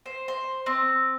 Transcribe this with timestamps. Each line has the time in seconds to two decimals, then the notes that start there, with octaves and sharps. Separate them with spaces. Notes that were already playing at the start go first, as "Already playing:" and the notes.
0.06 C5
0.28 C5
0.66 C4